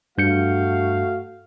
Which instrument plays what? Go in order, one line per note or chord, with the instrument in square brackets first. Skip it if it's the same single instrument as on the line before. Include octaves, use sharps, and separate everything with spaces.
[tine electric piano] G2 G6 C#7 [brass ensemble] A3 F#4 F5